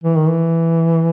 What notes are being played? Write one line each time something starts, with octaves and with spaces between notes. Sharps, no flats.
E3
D#3
E3